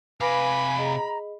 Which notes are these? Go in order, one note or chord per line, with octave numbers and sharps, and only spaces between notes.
C3 B4 F5 G#5 B5 D6 A#6 D7
G#4 D#5 A#5